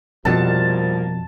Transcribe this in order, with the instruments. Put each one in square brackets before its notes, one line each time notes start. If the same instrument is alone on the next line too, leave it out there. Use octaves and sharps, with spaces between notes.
[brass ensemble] C2 F3 A#3 [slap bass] F2 B2 [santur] A5